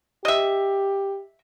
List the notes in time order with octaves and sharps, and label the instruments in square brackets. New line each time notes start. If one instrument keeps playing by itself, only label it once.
[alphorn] G4 [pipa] D#5 E5